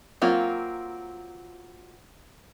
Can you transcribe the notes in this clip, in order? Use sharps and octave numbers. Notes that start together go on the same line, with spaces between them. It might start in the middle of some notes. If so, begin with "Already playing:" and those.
F#3 A#3 C4 F4